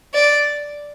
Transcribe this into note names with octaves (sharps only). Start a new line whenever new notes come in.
D5